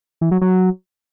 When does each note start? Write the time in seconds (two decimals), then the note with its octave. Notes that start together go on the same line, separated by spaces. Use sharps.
0.21 E3
0.31 F#3
0.41 F#3